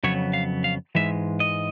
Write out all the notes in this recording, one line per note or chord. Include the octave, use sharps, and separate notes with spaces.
F2 C#3 F#3 B3 C#5
F5
F5
G#2 E3 G#3 E5
D#5